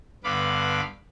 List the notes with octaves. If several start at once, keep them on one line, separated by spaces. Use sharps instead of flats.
G2 D3 B3 F5 B5 D6